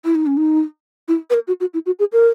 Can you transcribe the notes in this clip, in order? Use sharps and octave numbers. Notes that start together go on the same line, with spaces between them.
E4
D#4
C#4
D#4
E4
B4
A#4
F#4
F#4
E4
F#4
G#4
A#4